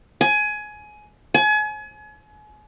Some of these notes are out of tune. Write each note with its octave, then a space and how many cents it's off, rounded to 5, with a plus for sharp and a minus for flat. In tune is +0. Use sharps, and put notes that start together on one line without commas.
G#5 +20
G#5 +35